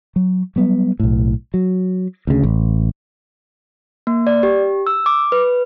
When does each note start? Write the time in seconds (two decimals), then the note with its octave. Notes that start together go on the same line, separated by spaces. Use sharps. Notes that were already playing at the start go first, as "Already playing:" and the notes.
0.16 F#3
0.56 F#3 G3 B3
1.00 B1 A2
1.54 F#3
2.27 D2 C#3
2.43 A1
4.07 A#3
4.27 D5
4.43 G4
4.87 E6
5.06 D6
5.32 B4